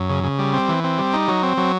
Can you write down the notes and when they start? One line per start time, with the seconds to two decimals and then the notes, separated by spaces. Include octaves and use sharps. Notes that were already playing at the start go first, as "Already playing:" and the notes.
Already playing: F#2
0.09 C#3
0.24 C#3
0.39 G3
0.53 C4
0.69 E3
0.84 C4
0.98 G3
1.13 D#4
1.28 F#3
1.43 C4
1.57 F#3